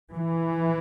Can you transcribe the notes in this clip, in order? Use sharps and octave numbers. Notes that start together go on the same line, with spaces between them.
E3